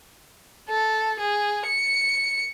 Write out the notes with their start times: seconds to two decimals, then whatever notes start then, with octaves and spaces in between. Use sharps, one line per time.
0.69 A4
1.20 G#4
1.66 C#7